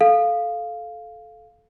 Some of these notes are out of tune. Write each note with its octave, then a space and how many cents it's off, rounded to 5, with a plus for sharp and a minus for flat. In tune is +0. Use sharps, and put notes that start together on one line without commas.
A4 -15 F5 +0